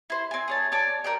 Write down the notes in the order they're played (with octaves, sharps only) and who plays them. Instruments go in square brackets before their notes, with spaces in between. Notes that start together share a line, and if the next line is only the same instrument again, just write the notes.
[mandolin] E4 C5
C4 G#5
G#4 C#5 A5
C#5 D5 A5
A#4 D5 G5